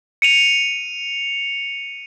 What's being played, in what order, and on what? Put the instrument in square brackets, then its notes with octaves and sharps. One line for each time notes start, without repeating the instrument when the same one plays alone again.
[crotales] C#7 D#7 F7